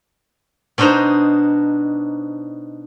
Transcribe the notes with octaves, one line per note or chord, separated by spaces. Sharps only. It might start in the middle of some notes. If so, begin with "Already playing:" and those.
B2 D4 D#4 C5 D#5 A#5